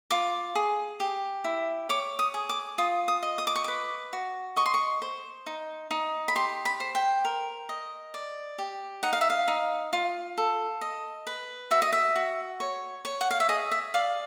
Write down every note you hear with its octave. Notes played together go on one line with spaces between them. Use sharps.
F4 D6
G#4
G4
E4
C#5 D6
D#6
G#4
D6
F4 D#6
D#6
D#5
D#6
D6
C#6
B4 D6
F#4
D#5 C#6
C6
C#6
C5
D#4
D#4
B5
G4 C6
B5
C5
G5
A#4
D#5
D5
G4
D#4 F#5
F5
E5
F5
D#4
F4
A4
D#5
B4
F#4 E5
D#5
E5
F#4
C#5
C#5
F#5
F5
E5
G#4 D#5
E5
D5 F5